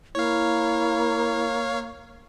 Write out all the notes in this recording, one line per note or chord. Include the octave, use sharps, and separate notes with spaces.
A#3 E4 C#5 F5